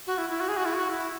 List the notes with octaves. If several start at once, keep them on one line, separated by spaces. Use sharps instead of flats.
F#4
E4
E4
F#4
G#4
F#4
E4
F#4
E4